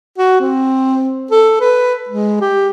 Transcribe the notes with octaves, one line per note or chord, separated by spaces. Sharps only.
F#4
C4
A4
B4
G#3
G4